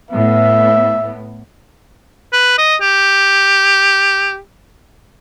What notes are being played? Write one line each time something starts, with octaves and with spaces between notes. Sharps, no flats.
A2 B3 E5
B4
D#5
G4